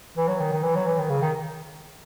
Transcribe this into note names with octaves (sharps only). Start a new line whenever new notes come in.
E3
F#3
D#3
D#3
E3
F#3
E3
D#3
C#3
D#3